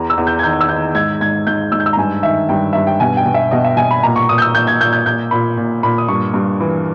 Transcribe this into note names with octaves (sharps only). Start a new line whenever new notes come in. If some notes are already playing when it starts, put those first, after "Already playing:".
Already playing: E2 A#5
E6
E2
G6
G#6
D#3 G6
E6
D#3 G6
G#2 G#6
G#2 G#6
G#2 G6
G#2 E6
G6
E6
A#5
G2 G#5
D#3 E5
G2 G5
G2 E5
G5
B2 G#5
G5
B2
E5
B2 D#5
E5
B2 G#5
B5
A#2 A#5
C#6
A#2 D#6
G6
E6
A#2 G6
G#6
A#2 G6
G6
A#2 G6
A#2 B5
A#2
A#2 B5
D#6
G2 C#6
G2
E3